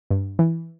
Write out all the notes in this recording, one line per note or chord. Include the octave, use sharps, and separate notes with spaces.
G2
E3